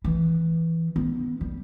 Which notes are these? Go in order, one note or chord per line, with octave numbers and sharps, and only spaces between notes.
E3
B3
G3